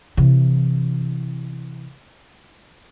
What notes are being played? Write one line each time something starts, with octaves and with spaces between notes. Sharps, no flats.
C3 E3